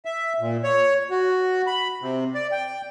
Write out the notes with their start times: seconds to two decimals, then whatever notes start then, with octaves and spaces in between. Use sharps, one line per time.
0.05 E5
0.40 A#2
0.64 C#5
1.11 F#4
1.67 B5
2.01 C3
2.34 D5
2.52 G5